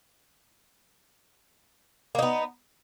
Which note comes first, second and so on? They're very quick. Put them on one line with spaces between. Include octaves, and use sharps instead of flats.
A#3 D#4 B3